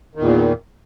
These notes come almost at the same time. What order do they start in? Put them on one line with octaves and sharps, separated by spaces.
D#3 E2 A#2